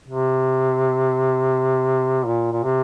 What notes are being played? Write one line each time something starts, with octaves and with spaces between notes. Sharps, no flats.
C3
A#2
A#2
C3